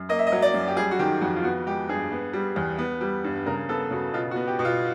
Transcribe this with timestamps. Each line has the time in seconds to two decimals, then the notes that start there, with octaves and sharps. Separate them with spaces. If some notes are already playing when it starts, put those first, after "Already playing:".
Already playing: F#2
0.09 A#3 D#5
0.19 E5
0.27 D#5
0.32 F#3
0.42 D5
0.54 F#2
0.68 G4
0.77 G3 G#4
0.91 F#4
0.99 D#3 G4
1.21 F2 F#4
1.36 F4
1.44 B3 F#4
1.66 G#3 G4
1.89 G2 G#4
2.12 B3
2.33 G3
2.56 E2
2.78 B3
3.01 G3
3.24 G2
3.46 C#3 A#4
3.69 B3 A4
3.91 C#3 F#4
4.13 B2 F4
4.31 F#4
4.36 B3
4.47 G4
4.59 B2
4.65 F4